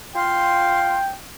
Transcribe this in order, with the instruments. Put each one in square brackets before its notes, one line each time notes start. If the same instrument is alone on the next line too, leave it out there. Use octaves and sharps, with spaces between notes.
[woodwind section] F4 F5 C6 [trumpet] G5